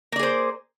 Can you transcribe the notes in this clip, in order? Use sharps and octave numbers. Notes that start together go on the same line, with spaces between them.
A#3 G#4 C5 D5